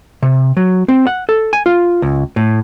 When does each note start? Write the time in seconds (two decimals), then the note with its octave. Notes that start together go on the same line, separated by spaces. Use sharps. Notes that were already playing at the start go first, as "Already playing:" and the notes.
0.22 C3
0.57 F#3
0.88 C4
1.07 F#5
1.29 A4
1.53 G#5
1.66 F4
2.02 C#2
2.36 A2